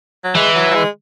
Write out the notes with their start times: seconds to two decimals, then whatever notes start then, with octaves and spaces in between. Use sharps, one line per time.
0.24 F#3
0.35 E3 G#3
0.55 F#3
0.71 F#3
0.74 G#3